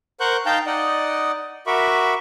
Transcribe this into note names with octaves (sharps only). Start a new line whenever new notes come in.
A#4 C5 F#5 C#6 F#6 G6
D#4 F5 G5 A5 A#5 G6
D#4 D5 D#5 F#5
F#4 A#4 E5 B5 C#6 D6